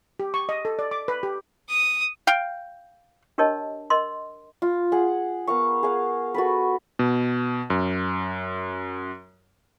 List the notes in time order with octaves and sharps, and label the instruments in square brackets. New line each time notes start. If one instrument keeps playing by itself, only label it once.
[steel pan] G4
C#6
D#5
A4
D5
D6
B4
G4
[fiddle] D#6
[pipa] F5 G5
[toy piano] D4 G4 A#4 C#5 D#5 A5
A#4 D#5 C6
[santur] F4
G#4 F#5
B3 A#4 F5 C#6
G#4 F5 F#5
F#4 A4 B4
[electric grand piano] B2
F#2